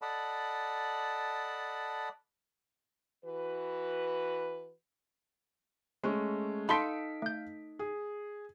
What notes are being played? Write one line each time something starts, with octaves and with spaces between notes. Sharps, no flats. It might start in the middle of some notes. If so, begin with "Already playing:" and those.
A4 D5 D#5 F#5 A5 B5
E3 F#4 B4
G#3 A3 C#4
D#4 A4 F5 B5 C6 B6 D7
A3 G6
G#4